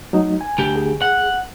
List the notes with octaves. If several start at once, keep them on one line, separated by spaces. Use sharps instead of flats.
F#3 A3 D#4
G#5
D2 G4
G#4
F#5